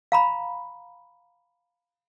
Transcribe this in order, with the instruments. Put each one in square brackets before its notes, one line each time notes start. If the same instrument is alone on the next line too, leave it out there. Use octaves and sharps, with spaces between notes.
[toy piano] F5 A#5 B5